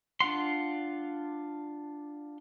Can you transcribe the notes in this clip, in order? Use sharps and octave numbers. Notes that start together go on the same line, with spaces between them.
D4 F4 F#5 C6